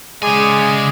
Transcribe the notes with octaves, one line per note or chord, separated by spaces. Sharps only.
C#3 G#3 G#4 D5 G#5